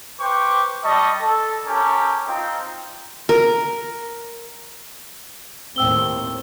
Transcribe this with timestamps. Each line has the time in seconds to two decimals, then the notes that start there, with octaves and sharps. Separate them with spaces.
0.20 B4 C5 G5 C#6 D6
0.83 G3 D#5 A5 C#6
1.21 A4
1.66 C#4 G4 A4 A#4 G#5
2.27 C4 D#4 F4 G5
3.29 A#4
5.76 D#2 A2 C4 G5 E6 G7